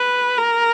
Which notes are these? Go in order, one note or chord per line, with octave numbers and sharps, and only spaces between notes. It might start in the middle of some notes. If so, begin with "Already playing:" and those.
Already playing: B4
A#4